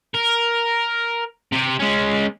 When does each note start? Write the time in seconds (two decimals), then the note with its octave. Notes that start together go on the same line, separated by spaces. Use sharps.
0.14 A#4
1.53 C3 G4
1.80 G#3 C#4